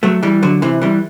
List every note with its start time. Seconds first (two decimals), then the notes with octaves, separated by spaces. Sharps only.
0.03 F#3 A3
0.23 E3 G3
0.43 D3 F#3
0.62 C3 E3
0.82 E3 G3